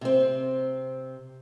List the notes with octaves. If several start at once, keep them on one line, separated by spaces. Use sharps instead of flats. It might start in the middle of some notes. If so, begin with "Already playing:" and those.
C3 C4